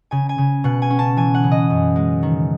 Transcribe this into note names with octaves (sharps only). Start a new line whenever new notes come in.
C#3 G#5
G#5
C#3
B2 F#5
G#5
C#4
A5
E3 G#5
F#5
C#3
D#5
F#2
G#3
D#3